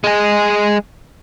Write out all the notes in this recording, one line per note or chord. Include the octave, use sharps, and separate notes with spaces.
G#3 G#4